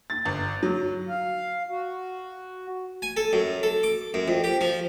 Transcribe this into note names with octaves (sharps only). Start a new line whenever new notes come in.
A6
G1
F#3
F5
F#4
G#5
A4
F#2
A4
D6
F#2
F2
G4
F3